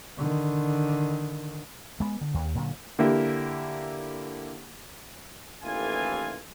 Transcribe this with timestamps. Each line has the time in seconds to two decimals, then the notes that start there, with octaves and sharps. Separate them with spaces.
0.18 D3 D#3
2.00 G#3 B3
2.21 D3
2.34 D#2
2.55 A#2 D3 F#3
2.99 D3 A#3 E4 G4
5.64 A1 D#2 E3 F4 A4 G#5